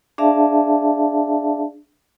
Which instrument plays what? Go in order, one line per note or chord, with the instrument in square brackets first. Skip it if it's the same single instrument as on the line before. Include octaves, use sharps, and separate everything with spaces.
[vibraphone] D4 G#4 D5 E5 F5 A5